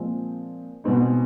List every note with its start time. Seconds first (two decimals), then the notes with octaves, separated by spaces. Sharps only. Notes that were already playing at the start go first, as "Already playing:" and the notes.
Already playing: A#2 F3 G#3 C4
0.84 B2 G#3 C4 D#4